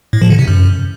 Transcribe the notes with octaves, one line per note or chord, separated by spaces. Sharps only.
A2
F3
D3
C3
F#2